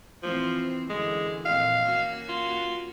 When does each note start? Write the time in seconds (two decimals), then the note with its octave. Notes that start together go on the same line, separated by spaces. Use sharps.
0.23 E3 F3 C4
0.89 F#2 D3 E3 G#3
1.45 F2 A#2 F5
1.85 A#3 C#4 F#4
2.29 F4